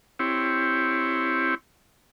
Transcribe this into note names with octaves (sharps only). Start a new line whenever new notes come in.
C4 E4 G4 C#5